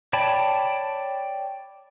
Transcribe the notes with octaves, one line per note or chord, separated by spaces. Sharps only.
C#5 D5 G5 A5 B5